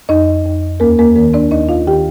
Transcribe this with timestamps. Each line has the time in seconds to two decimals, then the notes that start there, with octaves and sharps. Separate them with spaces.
0.09 F2 D#4 D#5
0.46 F2
0.80 D#2 A#3 A#4
0.99 A#3 A#4
1.16 D#3 A#3 A#4
1.34 D4 D5
1.51 D#2 D#4 D#5
1.69 F4 F5
1.87 D#3 G4 G5